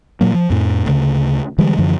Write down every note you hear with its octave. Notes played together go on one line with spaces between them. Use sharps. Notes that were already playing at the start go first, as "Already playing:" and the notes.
A#2 F#3 A#3
F3
F2 A2
D2 C#3
D3 E3 G3 G#3
F#2 D3 E3 F3